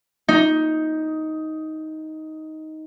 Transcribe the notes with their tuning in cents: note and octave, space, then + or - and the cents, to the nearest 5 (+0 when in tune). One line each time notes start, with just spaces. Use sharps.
D#4 +10